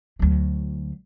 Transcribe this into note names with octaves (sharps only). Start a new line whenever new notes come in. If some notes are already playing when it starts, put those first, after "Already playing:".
D2 F#3